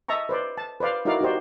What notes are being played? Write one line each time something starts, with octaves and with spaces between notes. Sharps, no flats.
D#5 E5 A5 A#5 C#6
B4 C5 D5
A5
B4 C5 D5 F5
D#4 E4 F#4 A#4 D5 F5
D#4 F#4 G4 C5 D5